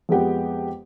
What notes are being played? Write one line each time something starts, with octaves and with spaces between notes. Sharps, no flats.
F2 G#3 B3 G4 F#5